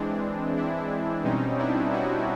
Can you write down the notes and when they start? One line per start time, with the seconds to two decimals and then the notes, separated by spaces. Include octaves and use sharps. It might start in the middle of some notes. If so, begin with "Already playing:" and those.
Already playing: E3 G#3 C4 D4
0.56 D4 E4
1.24 B2 G3 C4 C#4 D#4
1.59 D4 E4
1.93 E4 F#4